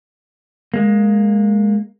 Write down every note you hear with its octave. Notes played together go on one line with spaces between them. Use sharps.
G#3 A#3